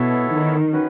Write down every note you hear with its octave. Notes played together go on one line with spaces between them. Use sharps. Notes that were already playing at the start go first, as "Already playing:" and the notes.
Already playing: B2 B3 E4 A4 C#5 E5
D#3
C#4 F#4 B4